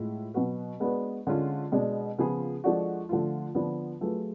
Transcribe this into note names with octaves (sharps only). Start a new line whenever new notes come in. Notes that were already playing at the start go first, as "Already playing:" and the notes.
Already playing: A2 G#3 F4
B2 F#3 B3 F#4 B4
G#3 B3 D4 F#4 B4
D3 G#3 C#4 F4
B2 G#3 D4
C#3 F3 B3 F4 G#4
F3 G#3 D4 F#4 A4
D3 F3 A3 F4
D3 F3 B3 D4
F#3 A3 F4 G#4 B4